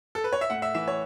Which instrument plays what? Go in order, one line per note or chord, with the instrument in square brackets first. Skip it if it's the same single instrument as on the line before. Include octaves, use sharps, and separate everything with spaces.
[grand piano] A4
B4
C#5
E5
A2 F#5
E5
E3 E5
C#5